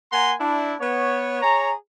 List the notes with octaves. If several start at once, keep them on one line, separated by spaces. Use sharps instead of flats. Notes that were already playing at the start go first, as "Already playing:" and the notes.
A#3 F#5 G#5 A#5 C6
D4 E4
B3 C#5
G#4 C#5 A#5